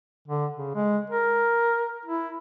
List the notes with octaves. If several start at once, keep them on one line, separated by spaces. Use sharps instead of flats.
D3
C#3
G#3
A#4
E4